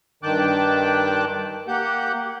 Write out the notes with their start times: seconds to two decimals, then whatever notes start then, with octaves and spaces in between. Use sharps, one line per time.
0.23 G2 D#3 G5 A5 D6 F#6
1.68 A#3 G4 F#5 G6